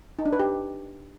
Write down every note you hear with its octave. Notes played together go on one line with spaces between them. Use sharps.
D#4
D4
B4
G4